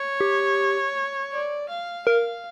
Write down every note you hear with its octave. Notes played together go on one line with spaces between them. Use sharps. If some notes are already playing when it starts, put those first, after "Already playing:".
Already playing: C#5
G4
D5
F5
A#4 F5